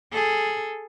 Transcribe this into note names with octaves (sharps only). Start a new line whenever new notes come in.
G#4 A4